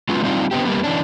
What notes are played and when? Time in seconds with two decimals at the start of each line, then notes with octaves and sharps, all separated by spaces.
0.09 F#3 G#3 B3 C#4 F4
0.24 G3 C4 D4 D#4 F4
0.51 D3 B3 C4 G4
0.65 G3 A#3 B3
0.84 E3 C#4 D4